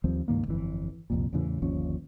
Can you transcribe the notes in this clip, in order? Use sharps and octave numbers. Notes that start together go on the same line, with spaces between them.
D#2 F3 G3 C4
C#2 G2 D#3 A#3
G1 F2 B2 E3
C2 F2 A#2
E2 A2 C#3 E3
G1 D#2 F3 C#4